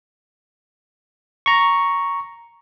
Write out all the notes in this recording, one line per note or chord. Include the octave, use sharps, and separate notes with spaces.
A#5 C#6